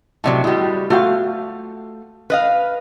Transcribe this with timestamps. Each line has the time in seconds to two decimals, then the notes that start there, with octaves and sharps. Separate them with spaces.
0.24 A2 C3 F#3 D5 D#5 A5
0.44 G3 G#3 E4 F#4
0.90 A3 F4 F#4 F5 G5
2.30 B4 D#5 F5